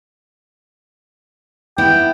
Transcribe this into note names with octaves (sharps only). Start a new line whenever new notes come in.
B3 E4 G5